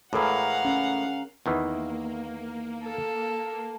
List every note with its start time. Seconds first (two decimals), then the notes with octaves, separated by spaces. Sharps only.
0.13 A2 E3 G#4 A#4 F5 F#5
0.65 C#4
1.46 E2 D#3 E3 A#3
2.83 A4